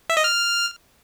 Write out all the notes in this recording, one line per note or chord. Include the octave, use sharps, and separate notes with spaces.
E5
D#5
F6